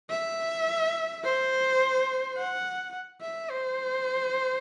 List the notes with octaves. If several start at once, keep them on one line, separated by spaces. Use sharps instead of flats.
E5
C5
F#5
E5
C5